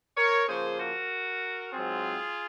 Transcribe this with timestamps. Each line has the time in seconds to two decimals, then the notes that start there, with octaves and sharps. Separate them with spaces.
0.17 A#4 C#5
0.48 C#3 F3 A#3 G#4 C5
0.79 F#4 A#4
1.72 G#2 F#3 C4 F4 G#4